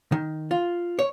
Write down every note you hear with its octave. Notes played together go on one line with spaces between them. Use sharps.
D#3
F4
C#5